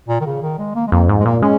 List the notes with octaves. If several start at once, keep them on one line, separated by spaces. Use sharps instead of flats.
A#2
D#3
C#3
D#3
G#3
A#3
G#3
F2 A#3
G#2
G#3
A#2 A#3
G#3 C#4